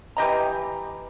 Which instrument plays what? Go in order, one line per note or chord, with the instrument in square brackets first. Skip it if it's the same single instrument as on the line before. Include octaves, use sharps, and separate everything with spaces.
[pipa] E3 G4 D#5 A#5